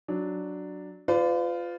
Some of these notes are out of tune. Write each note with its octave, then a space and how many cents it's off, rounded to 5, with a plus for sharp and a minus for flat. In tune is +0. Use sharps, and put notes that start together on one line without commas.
F#3 +0 D4 +0
F4 +0 B4 +45 D5 +0